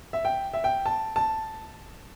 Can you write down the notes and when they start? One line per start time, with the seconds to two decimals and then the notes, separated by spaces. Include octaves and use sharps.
0.13 E5
0.25 G5
0.54 E5
0.64 G5
0.86 A5
1.16 A5